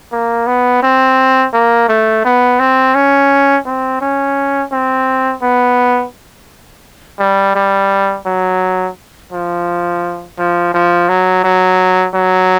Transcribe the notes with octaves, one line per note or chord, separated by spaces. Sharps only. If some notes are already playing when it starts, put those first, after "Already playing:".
A#3
B3
C4
A#3
A3
B3
C4
C#4
C4
C#4
C4
B3
G3
G3
F#3
F3
F3
F3
F#3
F#3
F#3